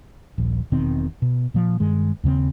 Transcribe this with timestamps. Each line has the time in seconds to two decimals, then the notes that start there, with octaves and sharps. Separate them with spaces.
0.38 D#1 A#1
0.72 E1 B2 D#3 C4
1.22 B2
1.54 A#2 F3
1.80 G2 D#3 G#3
2.24 D#2 C#3 A#3 C4